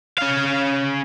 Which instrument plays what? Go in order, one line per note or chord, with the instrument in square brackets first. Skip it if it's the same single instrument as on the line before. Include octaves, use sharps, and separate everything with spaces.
[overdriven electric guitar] C#4 F5